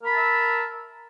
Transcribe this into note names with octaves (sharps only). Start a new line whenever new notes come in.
A#4 E5 A5 B5